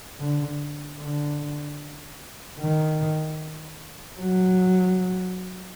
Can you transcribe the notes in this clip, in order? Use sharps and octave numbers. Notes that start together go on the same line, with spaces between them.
D3
D3
D#3
F#3